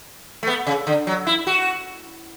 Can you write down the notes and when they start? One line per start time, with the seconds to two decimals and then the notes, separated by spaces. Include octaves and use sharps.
0.43 A3
0.47 B3
0.67 C#3
0.87 D3
1.07 F#3
1.27 E4
1.47 F#4